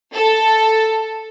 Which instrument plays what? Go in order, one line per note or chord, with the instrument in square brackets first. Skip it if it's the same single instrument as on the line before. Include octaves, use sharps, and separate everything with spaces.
[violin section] A4